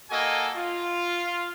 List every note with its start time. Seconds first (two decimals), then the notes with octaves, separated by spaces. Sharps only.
0.10 A#3 F#4 A4 D#5 G#5
0.55 F4